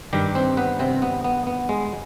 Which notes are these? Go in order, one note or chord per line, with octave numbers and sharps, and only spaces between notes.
G2 D#3 G3 G4
C4 C5
B3 B4
C3 C4
B3
B3
B3
G#3